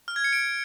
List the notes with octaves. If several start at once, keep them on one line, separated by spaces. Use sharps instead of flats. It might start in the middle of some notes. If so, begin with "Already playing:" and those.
F6
G#6
C#7
D7